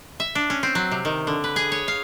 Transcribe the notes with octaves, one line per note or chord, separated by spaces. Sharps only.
E5
D4
C#4
C4
F#3
C3
D#3
D3
B4
G#4
C#5
F5